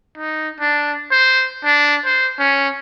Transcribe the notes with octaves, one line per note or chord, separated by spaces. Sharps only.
D#4
D4
C5
D4
C5
C#4